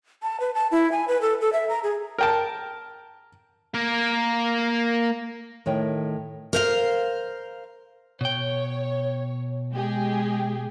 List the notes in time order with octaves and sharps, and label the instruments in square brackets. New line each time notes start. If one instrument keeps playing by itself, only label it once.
[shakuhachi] A5
B4
A5
E4
G#5
B4
A4
A4
E5
A#5
G#4
[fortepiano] A#4 G5 A5
[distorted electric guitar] A#3 A#4
[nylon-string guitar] A2 D#3 C#5 G5
[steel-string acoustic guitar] A#4 C5 F5
[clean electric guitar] B2 G5 [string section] C#5
[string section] G#3 G4 G#4